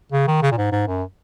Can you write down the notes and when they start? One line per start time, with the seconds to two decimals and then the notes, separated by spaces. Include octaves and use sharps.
0.12 C#3
0.27 D#3
0.42 C#3
0.52 A#2
0.58 G#2
0.72 G#2
0.87 F#2